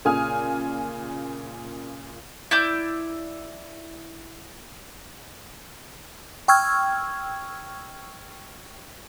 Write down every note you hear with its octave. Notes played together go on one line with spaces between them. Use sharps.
A#2 C#3 G#5 D#6 F6
E4 D5 G6
G5 C#6 E6 F6 G#6